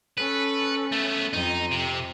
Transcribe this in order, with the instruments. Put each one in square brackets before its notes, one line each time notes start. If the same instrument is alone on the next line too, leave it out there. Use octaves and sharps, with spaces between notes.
[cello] C#4 A4 [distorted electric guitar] B4
[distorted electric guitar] A3 B3
[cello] F2 [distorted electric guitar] D#4
[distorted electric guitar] C3